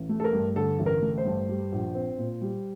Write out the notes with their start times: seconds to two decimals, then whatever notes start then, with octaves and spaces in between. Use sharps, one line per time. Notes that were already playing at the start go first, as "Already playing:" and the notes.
Already playing: A1
0.09 A3
0.20 A4
0.24 A#4
0.33 G2
0.56 D3 A4
0.79 A1
0.86 A#4
1.02 A3
1.18 C5
1.25 G2
1.49 G3
1.72 A#1
1.95 C4
2.18 A#2
2.41 G3